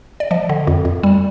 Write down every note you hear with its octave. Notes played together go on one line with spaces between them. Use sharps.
D5
F3 D#5
D3
F2
F2
G3